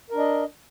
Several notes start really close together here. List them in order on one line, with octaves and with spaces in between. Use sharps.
A#4 D4 D#5